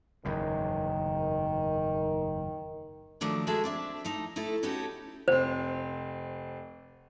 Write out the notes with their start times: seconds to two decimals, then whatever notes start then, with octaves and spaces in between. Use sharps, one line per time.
0.25 F#1 E2 G#2 D#3
3.21 D#3 F3 F#3 A3 D4
3.47 G#3 A#3 F#4 G#4 A4 E5
3.64 C4 D4 E5
4.04 F3 A3 D#4
4.36 A3 D#4 E4 A4
4.63 B3 C#4 D#4 F#4 G4 A4
5.28 F1 C4 C5